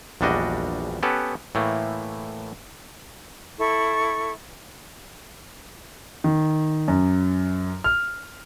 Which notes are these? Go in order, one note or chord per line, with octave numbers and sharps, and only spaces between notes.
A#1 E2 G3 D4 F#4 D#5
B3 C#4 G4 A4 B4
A2 E3 A3 A#3
E4 A4 C#6
D#3
F#2
F6